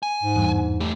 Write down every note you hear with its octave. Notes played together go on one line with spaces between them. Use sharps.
G#5
G#2
E2 G2
A3 G4